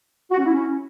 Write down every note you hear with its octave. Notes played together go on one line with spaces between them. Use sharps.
F#4
C#4
E4
C#4